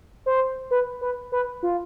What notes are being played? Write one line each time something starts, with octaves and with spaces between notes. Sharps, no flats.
C5
B4
B4
B4
F4